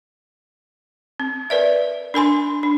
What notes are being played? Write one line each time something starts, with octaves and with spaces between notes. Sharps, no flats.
C4
A#4 B4 D5 E5
D4 A#4 G#5 C6
D4